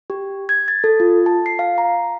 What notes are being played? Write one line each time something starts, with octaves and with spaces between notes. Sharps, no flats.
G4
G#6
A6
A4
F4
A5
C7
F5
A#5